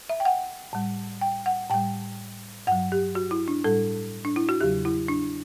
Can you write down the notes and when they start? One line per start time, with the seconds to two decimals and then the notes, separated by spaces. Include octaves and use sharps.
0.09 E5
0.20 G5
0.25 F#5
0.73 A2 G3
1.21 G5
1.46 F#5
1.70 A2 G3 G5
2.67 G2 F#3 F#5
2.92 G4
3.15 F#4
3.31 E4
3.48 D4
3.64 A2 G3 A4
4.25 D4
4.36 E4
4.49 F#4
4.61 E2 C#3 F#3 G4
4.85 E4
5.08 D4